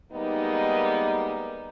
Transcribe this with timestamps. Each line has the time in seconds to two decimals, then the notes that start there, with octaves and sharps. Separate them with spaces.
0.11 D#3 G3 G#3 A#3 B3 D#4